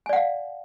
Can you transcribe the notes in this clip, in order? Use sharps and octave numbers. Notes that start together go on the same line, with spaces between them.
D5 F5 F#5 G#5